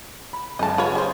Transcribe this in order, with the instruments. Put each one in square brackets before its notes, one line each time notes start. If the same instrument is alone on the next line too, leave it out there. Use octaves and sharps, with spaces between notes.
[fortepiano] B5
[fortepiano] F#2 C#3 G#3 [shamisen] D#5 A5
[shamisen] F4 B4 C#5 [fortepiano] B5
[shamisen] C#4 C5 [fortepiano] G#4